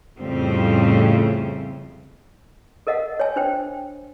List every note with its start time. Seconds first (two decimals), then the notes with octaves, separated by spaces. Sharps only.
0.21 F2 A2 C#3 G3 A3 C4
2.87 A4 A#4 D#5 F5 F#5
3.20 C#5 G#5
3.36 D4 C5 G5 G#5